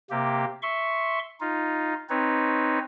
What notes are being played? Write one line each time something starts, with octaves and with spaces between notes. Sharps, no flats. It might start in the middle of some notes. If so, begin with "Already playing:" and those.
C3 A#3 G4
E5 C6 C#6
D#4 F4
C4 D#4 B4 C#5